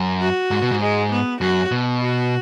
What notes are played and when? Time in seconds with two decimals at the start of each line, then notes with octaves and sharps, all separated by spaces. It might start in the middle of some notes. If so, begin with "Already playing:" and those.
Already playing: F#2
0.21 F#4
0.51 G#2
0.62 B2
0.71 G#2
0.81 G#3
1.12 B3
1.40 F#2 F#4
1.71 B2
2.01 F#4